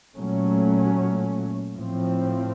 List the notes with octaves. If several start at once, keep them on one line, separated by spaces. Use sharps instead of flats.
A#2 F#3 A3 C#4
A2 F3 C4